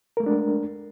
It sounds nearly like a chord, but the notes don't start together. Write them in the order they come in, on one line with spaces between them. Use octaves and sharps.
A#4 A3 G#3 D4